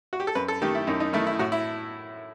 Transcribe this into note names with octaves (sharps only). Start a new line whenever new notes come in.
F#4
G4
A4
F#2 B4
A4
D#3 A3 G4
E4
F#2 D#4
D#4
D#3 A3 E4
E4
A2 F#4
E4